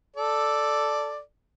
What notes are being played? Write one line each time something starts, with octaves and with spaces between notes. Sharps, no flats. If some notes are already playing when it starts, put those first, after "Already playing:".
A4 D5